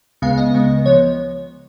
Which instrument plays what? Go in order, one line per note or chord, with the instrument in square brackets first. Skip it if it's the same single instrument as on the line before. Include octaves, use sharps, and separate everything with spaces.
[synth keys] C#2 C#3 G#3 B3 F5
D#5
C#2 C#3 G#3 B3
F3 B3 C#5